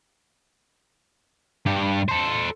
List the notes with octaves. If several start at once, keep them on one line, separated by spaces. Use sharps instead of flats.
G2 G4
A4 C5